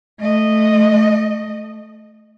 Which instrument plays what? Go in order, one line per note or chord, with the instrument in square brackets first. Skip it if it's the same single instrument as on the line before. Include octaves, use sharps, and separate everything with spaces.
[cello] A3 D#5